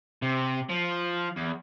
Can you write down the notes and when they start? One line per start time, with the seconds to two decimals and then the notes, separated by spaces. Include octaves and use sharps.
0.22 C3
0.70 F3
1.37 E2